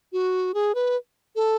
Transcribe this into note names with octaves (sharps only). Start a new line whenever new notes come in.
F#4
G#4
B4
A4